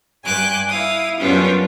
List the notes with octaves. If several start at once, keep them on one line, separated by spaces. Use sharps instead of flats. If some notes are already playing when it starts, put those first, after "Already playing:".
G2 G#5 D6 F#6 G6
E4 F5 D#6
F#2 G3 B3 C#4 D4 F4